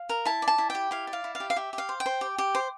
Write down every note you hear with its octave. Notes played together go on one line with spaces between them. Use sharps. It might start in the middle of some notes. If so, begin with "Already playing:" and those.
Already playing: F5
A#4
E4 A5
D5
A5
E4
G4 G5
E4 F5
D5
F5
E4
F5
G4
F5
G4 E5
G4
F5
C5
G5
C5
G4
G4
C5